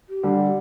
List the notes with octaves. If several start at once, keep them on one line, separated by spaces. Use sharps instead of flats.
G4
D3 G3